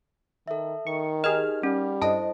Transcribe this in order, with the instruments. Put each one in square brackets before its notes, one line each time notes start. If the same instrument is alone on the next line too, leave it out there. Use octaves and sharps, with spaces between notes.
[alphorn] D#3 [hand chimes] A4 E5
[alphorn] D#3 [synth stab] C#6
[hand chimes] D#4 G4 A#4 [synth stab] G#4 F6 [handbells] D#5
[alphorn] G3 [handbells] C#4
[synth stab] G2 D#5 [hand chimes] E4 A4 C5 [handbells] A5